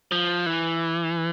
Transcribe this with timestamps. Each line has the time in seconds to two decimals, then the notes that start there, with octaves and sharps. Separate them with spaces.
0.12 F3
0.46 E3